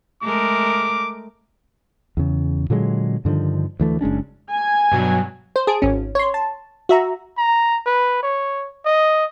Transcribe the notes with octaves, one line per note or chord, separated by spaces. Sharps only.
G#3 A3 A#4 D6
E2 C#3
A#2 D3 F#3 G#3
G2 D3 D#3 F3
D2 E3 A3
F#1 G#3 C#4 D4
G#5
G2 B2 F#3
C5
G#4 A5 D7
G#1 C#4
C#5 C6
A5
F#4 E5 A#5
A#5
B4
C#5
D#5